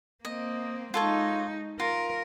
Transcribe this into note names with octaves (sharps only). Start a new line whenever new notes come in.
A#3 C4 D#5
G#3 D#4 F4 A4 C#5
F4 A#4